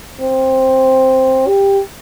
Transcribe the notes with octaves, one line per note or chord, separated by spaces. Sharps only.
C4
G4